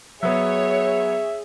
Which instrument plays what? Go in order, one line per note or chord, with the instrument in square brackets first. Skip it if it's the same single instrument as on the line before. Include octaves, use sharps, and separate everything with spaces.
[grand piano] F#3 B3 [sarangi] G#4 [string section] C#5 [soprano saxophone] E5